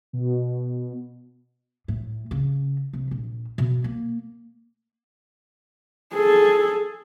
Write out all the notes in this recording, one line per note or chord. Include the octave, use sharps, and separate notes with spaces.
B2
A2
C#3
C3
A#1
B2
A#3
G#4 A4